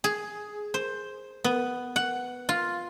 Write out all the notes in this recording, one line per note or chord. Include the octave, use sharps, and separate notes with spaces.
G#4
C5
B3
F#5
F4